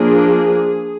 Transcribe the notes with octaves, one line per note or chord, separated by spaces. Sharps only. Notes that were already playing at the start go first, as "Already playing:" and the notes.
Already playing: F3 A#3 D4 G#4